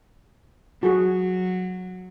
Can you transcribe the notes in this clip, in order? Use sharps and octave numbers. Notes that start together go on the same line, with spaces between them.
F#3 F#4 G#4